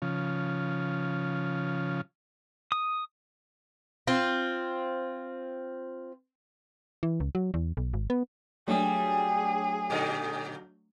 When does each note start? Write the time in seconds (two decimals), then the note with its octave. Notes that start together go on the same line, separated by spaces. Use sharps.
0.02 C#3 F3
2.72 D#6
4.07 C4 F4
7.03 E3
7.20 C#2
7.35 F#3
7.54 E2
7.77 B1
7.94 G#1
8.10 B3
8.68 F#3 G3 A3 D4 G#4
9.90 A#2 D3 D#4